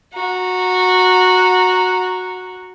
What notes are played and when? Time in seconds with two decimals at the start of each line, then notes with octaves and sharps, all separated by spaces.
0.12 F#4 A#5